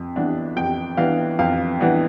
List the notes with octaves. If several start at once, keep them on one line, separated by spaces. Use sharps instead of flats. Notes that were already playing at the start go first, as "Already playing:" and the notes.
Already playing: F2
E3 B3 D4
F2 G5
E3 B3 D4 F5
F2 F5
E3 B3 D4